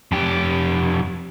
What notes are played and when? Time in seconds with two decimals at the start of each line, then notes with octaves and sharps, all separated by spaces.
0.12 F2 G4